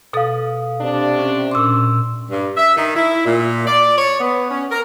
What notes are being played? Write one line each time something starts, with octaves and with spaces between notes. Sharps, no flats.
B2 A4 F5 D#6
C3 D4
C#4
A#2 C#4 C6 D6 E6
G2
E5
D#3
E4
A#2
D5
C#5
B3
C#4
A#4